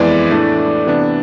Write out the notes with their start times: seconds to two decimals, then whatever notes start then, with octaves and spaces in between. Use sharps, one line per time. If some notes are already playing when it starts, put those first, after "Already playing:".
Already playing: F2 E3 G#3 B3 E4 D5
0.31 A2 E3 A3 D4
0.86 C3 E3 B3 D4